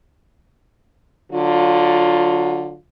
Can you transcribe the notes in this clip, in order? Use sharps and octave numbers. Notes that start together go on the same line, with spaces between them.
D3 F#3 F4